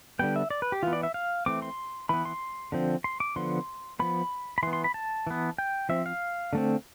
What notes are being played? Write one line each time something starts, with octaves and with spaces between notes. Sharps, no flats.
D3 G3 B3 G5
E5
D5
B4
G4
E3 B3 F4
D5
E5
F5
E3 A3 C4 D6
C6
E3 B3 B5
C6
D3 F3 C4
C6
D6
D3 F3 B3 C6
F3 B3 B5
B5
E3 B3 C6
C6
B5
A5
E3 B3
G5
F3 C4 E5
F5
D3 A3 C4